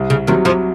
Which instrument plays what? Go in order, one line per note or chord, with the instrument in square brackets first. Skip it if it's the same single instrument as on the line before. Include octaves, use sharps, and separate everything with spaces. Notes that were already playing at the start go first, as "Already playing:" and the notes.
Already playing: [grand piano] C2
[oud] C#3
[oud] D#2 D#3 [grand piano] C3 F#3
[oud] F2 F3